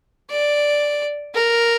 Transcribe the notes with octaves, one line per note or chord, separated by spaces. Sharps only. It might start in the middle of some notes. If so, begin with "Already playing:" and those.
D5
A#4